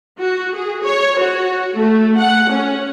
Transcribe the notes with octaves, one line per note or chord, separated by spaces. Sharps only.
F#4
G#4
C#5
F#4
A3
F#5
C#4